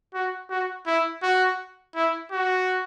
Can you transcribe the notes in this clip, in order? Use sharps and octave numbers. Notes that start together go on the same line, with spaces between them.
F#4
F#4
E4
F#4
E4
F#4